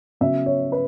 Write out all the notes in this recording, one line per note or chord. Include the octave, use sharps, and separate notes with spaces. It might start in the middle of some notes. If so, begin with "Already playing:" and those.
C#3 F#3 B3 E5
C#5
B4